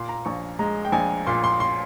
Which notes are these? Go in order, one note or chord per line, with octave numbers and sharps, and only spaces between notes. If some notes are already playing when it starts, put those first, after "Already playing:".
Already playing: A#2 C6
A#5
A#1 C#6
G#3 A#5
G5
A#1 G#5
A#2 C6
C6
C6